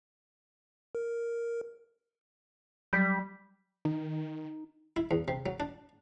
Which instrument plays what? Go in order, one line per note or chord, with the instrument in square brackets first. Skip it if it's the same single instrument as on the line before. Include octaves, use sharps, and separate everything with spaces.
[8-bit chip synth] A#4
[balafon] F#3 B5 [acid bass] G3 [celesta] G6 B6
[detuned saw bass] D#3 [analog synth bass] D#4
[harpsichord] E4
E2
C3
F#3
D4